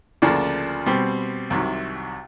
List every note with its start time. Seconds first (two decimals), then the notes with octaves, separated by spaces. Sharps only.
0.22 D2 C#3 F3 A#3 D4
0.86 B2 G3 C4
1.50 C2 C3 D#3 F#3